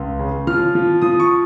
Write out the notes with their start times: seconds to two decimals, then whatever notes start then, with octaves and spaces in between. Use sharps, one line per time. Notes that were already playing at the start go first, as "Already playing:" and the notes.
Already playing: C#2
0.19 C#3
0.47 F3 F6
0.75 F3
1.02 F3 D#6
1.20 C#6